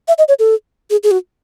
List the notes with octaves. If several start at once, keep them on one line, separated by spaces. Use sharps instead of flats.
E5
D#5
C#5
A4
G#4
G#4
F#4